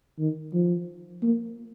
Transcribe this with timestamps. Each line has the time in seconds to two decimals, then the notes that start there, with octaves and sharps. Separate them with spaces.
0.19 D#3
0.54 F3
1.23 A#3